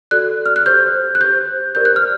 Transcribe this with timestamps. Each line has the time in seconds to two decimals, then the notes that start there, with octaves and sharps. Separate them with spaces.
0.11 F#4 A4 D5 F#6
0.46 F6
0.56 F#6
0.66 G4 C5 G6
1.15 F#6
1.20 G4 C5 G6
1.75 G4 A#4 D5 G6
1.85 F#6
1.96 F6